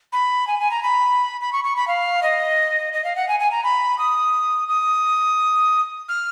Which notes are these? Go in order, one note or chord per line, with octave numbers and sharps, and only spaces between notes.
B5
G#5
G#5
A#5
B5
B5
C#6
C#6
B5
F5
D#5
D#5
F5
F#5
G#5
G#5
A#5
B5
D#6
D#6
F6